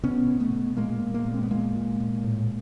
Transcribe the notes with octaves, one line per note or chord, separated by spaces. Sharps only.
B2 B3 C#4
B2
A3 B3
B2
A#2 G#3 A#3
A#2
G#3 A#3
A#2
C4
B3
A#2 G#3 A#3
A#2
A#2
A2